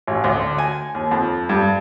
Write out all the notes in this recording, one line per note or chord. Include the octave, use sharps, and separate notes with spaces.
A1
D2
G#5
D#2
F2
G2